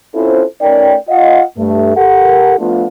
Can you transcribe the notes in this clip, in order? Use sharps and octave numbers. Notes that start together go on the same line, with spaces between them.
C4 C#4 E4 F4 A4 C5
A3 C#4 D#4 A#4 D5 G5
F4 D#5 F5 F#5
G2 A3
G4 A4 A#4 F#5
F3 A3 B3 D4 F4